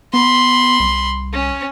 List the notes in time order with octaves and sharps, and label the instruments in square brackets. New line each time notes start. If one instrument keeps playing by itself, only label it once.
[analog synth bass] B3 [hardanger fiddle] B5 C6
[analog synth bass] C2
[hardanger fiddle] C#4